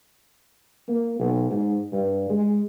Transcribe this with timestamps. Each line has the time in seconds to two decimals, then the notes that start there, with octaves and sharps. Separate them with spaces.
0.88 A#3
1.19 B1
1.50 G#2
1.92 G2
2.30 G#3